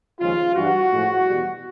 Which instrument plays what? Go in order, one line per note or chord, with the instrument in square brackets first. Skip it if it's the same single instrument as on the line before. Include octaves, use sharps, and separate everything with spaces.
[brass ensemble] D#2 C#3 F3 G#3 F4
G2 E3 G3 F#4
A2 F3 G#3
E2 B2 G3